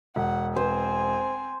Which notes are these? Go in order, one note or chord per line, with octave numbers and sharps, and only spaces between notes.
E1 F#5
C4 C5 G#5